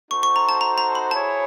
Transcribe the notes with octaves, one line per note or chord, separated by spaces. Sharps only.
D#4 F#4 A4 C5 C#6
C#6
A#5
A5
A#5
A#5
B5
E4 G#4 C#5 A5